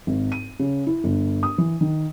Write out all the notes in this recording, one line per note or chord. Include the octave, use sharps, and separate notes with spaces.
G#1
D#7
C#3
E4
G1
D#6
E3
D#3